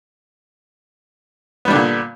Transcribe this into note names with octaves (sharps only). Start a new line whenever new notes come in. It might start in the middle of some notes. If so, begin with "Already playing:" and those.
A#2 D3 G3 B3 D4